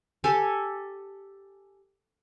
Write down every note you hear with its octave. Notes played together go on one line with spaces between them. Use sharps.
G4 A4 G#5